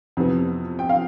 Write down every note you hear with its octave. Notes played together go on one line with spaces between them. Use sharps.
F2 C3 E3 B3
G5
F5